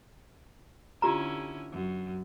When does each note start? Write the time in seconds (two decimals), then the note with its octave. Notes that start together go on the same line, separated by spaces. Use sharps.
1.02 D3 C#4 E4 F4 G4 A#5
1.72 F#2